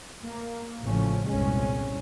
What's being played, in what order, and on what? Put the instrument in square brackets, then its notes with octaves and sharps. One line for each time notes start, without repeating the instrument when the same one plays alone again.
[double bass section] A#3
A1 A2 C#3 F3 C#4
G1 C2 A#2 G#3 C#4